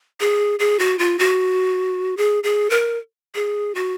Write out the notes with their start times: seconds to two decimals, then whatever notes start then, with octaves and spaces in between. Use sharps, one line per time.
0.20 G#4
0.59 G#4
0.79 F#4
0.99 F4
1.19 F#4
2.17 G#4
2.44 G#4
2.70 A#4
3.35 G#4
3.75 F#4